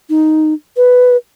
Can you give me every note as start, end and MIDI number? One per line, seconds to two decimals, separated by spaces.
0.10 0.54 63
0.77 1.16 71